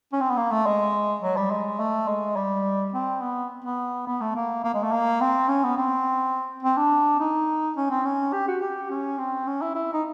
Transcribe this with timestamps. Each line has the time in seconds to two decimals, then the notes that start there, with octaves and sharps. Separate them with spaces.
0.13 C#4
0.21 C4
0.30 B3
0.37 A#3
0.51 A3
0.66 G#3
1.22 F#3
1.37 G3
1.51 G#3
1.79 A3
2.08 G#3
2.36 G3
2.94 C4
3.21 B3
3.64 B3
4.07 B3
4.21 A3
4.36 A#3
4.64 A#3
4.74 G#3
4.83 A3
4.92 A#3
5.21 C4
5.48 C#4
5.64 B3
5.77 C4
6.63 C4
6.77 D4
7.20 D#4
7.76 C#4
7.90 C4
8.05 C#4
8.33 G4
8.48 F#4
8.61 G4
8.90 C#4
9.19 C4
9.47 C#4
9.61 E4
9.75 E4
9.93 D#4